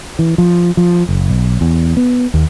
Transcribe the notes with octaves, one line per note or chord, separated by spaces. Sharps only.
E3
F3
F3
F#1
B1
E2
B3
D#2